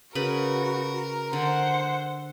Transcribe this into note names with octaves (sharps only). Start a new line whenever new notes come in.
C#3 F#4 A#4 B4 B5
D3 C5 F#5